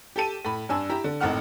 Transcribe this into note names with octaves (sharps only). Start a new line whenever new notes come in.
G4 A4 A5 D#7
A2 B5
G2 D4 G#5 E6
E4 G4 A#5
D3
G#1 A2 C4 D#4 F#5 F6